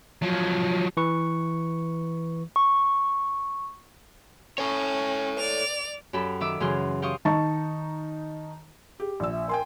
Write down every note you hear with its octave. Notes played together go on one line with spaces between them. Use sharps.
F3 F#3
E3 B4 C#6
C#6
C#4 A4 C#5
D5 F7
F#2 G4 A4 B5
D#3 E5 D6 E6
F#2 C#3 E3 G#4 C6 F6
G4 F5 C6 C#6 D#6
D#3 D#4 A5 C#6
G4 G#4
A#1 D5 E6
E5
A#4 G5 G#5 C6